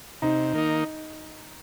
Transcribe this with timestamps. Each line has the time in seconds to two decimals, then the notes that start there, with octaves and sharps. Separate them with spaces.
0.22 C3 D#4
0.53 D#3 A#3 D#4